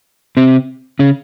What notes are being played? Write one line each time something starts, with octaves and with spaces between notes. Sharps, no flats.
C3 C4
C#3 C#4